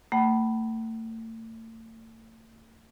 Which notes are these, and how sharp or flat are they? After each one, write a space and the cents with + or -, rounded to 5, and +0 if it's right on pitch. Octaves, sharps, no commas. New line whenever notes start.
A3 +40 F#5 +45 B5 +0